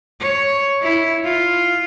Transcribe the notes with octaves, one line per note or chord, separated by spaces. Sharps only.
C#5
E4
F4